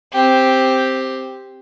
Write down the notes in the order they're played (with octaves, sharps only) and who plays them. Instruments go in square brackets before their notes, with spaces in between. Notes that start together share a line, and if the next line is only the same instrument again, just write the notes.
[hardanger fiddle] C4 G4